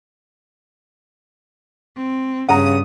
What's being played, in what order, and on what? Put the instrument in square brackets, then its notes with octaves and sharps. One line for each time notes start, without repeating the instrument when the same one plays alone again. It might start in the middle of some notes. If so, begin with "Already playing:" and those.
[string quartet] C4
[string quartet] G2 D#6 [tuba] C#3 [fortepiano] F#5 A#5